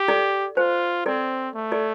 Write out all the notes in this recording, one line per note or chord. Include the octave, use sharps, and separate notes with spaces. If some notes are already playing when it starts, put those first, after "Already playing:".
Already playing: G4
A4 D5
F4 C5
C4 A4 D5
A3
A4 D5